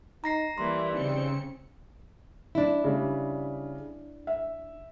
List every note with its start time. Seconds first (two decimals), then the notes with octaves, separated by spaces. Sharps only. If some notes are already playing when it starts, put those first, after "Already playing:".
0.24 D#4 A#5 A#6 C7
0.58 E3 G3 A#3 C6
0.93 C#3 C4 D#4 C#7
2.55 D4 E4
2.84 C#3 G3
4.27 E5